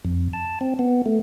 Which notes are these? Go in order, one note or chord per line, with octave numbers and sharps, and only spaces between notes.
F2
A5
C4
B3
A3